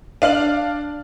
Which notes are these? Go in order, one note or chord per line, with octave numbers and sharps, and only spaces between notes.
D4 F5 F6 F#7